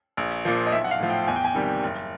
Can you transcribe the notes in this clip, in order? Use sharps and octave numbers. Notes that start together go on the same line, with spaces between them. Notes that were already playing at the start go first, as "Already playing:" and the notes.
A#1
A#2 F3
D#5
B1 E5
F#5
F5
A2 F3
G5
E2 G#5
G5
G#5
C3 D#3 G3
F#1